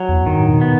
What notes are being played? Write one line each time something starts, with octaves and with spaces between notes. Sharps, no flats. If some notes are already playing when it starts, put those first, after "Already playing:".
Already playing: F#3
E2
F#2
G2 D#3
A2
B2
B3